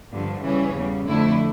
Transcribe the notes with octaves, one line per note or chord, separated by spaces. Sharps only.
G2 D3 F3
C#3 E3 G3 C#4
E2 C#3 G3
F2 D3 A3 E4